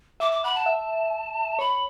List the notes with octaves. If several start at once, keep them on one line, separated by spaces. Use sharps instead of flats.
E5 D6
D6
F#5 B5
A5
E5
C#5 B5